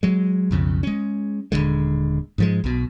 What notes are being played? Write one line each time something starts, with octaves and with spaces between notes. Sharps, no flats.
F#3 G#3
B1 F2 C#3
G#3 C#4
D#1 C2 D3 G#3
G#2 F3 G#3
B1 B2